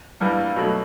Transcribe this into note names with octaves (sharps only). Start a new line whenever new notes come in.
G2 E3 G3 A#3
B2 F#3 A3